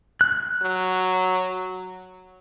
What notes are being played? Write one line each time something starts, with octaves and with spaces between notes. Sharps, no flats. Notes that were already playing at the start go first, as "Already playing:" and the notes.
F#6
F#3